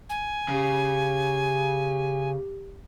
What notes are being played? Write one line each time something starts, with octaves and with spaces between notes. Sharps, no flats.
G#5
C#3 G4